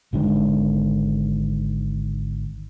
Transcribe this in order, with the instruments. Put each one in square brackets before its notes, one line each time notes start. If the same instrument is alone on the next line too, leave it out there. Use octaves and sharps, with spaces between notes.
[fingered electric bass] G#1 D3 D#3 G#3